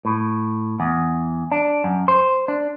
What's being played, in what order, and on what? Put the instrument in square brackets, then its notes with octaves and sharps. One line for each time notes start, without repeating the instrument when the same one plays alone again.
[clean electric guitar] A2
E2
D4
F#2
C5
D4